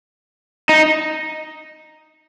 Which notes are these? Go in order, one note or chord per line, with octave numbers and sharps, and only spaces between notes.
D#4